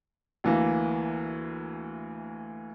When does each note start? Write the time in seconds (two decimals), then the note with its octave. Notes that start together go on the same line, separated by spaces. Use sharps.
0.44 D2 E3 A#3